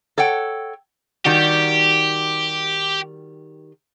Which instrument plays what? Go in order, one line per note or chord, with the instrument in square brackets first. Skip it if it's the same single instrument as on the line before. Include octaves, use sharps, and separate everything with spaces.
[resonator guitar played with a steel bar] A4 C#5 F#5 G5
[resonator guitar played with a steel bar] D#3 G3 F#4 [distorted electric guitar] G4